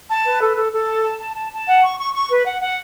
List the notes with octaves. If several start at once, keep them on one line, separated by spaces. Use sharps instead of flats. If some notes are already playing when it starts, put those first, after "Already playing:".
A5
B4
A4
A4
A4
A5
A5
A5
A5
A5
F#5
C#6
C#6
C#6
B4
F#5
F#5